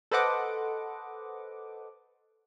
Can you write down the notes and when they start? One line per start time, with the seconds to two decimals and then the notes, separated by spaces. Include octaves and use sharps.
0.11 A4 B4 C5 D#5 F#5 D6